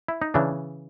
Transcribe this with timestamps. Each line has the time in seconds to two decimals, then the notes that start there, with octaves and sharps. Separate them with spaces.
0.08 E4
0.22 D#4
0.34 C#3 E3 D4